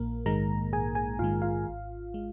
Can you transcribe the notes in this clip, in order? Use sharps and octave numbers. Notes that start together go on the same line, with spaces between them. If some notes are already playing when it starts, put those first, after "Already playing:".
Already playing: A#1 A#3 A#4
G#2 D#3 G#3 A#4 A#5
A#1 G#4 G#5
G#4 G#5
G#2 D#3 G#3 F4 F5
F4 F5
G#1
G#3